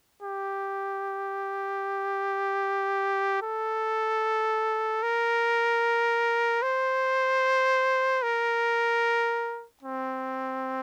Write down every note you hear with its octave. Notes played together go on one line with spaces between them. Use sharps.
G4
A4
A#4
C5
A#4
C4